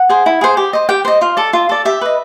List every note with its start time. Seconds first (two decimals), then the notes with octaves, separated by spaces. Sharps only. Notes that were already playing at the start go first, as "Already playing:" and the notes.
Already playing: F#5
0.09 G#4 C5
0.26 E4
0.41 G#4 C5
0.57 G4
0.73 C5 D#5
0.89 G4 G5
1.05 C5 D#5
1.21 F4
1.37 A4 D5
1.53 F4
1.69 A4 D5
1.85 G4 E5
2.01 B4 D#5